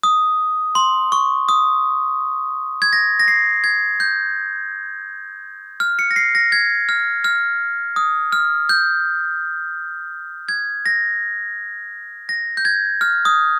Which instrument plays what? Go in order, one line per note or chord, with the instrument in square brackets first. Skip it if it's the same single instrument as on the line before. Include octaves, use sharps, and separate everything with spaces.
[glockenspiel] D#6
C6
C#6
D#6
G#6
A#6
A#6
C7
G#6
G6
F6
C#7
A#6
C7
A#6
G#6
F6
F6
D#6
F6
G6
G#6
A#6
A#6
G6
G#6
F6
D#6